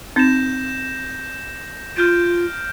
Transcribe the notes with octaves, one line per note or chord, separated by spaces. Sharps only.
C4 D#4 G6 A#6 E7
F4 F6 G6 D7